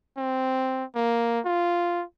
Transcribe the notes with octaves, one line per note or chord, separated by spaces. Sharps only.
C4
A#3
F4